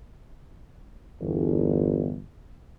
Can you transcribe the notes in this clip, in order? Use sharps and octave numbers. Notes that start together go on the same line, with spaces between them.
G1 E2